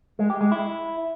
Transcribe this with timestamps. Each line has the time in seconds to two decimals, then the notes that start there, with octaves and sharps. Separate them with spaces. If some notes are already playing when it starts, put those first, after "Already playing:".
0.19 G#3
0.30 G4
0.41 G#3
0.52 E4